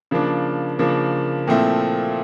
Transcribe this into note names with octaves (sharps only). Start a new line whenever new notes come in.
C#3 F3 A#3 D4
C#3 F3 A#3 D4
A#2 F3 A3 C4 E4